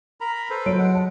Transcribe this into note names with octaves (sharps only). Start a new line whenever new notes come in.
A#4 A#5 B5
A4 B4 C5
F#3 C#5 D7
G#3 F#5
A5